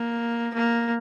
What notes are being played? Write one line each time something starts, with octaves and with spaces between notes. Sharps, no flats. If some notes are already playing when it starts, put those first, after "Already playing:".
Already playing: A#3
A#3